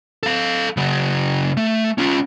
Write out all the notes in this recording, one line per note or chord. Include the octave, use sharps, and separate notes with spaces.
A4 F5
C#3 F#3
A3
C#4 F4